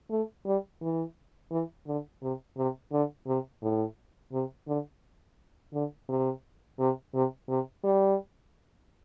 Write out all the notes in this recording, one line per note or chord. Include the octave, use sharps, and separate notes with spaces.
A3
G3
E3
E3
D3
C3
C3
D3
C3
A2
C3
D3
D3
C3
C3
C3
C3
G3